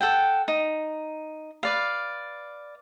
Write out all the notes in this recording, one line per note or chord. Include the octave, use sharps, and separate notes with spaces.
A4 F#5 G5
D#4
B4 D5 F5